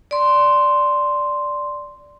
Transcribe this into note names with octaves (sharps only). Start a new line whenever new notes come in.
D5 C6